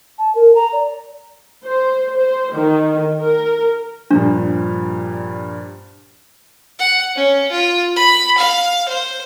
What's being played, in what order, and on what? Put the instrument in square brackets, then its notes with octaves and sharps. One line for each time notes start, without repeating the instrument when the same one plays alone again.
[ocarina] A5
A#4
A#5
D5
[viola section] C5
C5
D#3
A#4
[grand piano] G2 A#2 F3 [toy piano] D4
[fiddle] F#5
C#4
F4
B5
F5
C5